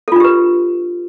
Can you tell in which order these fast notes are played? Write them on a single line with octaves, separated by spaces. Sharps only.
A4 F4 D4 G4 B4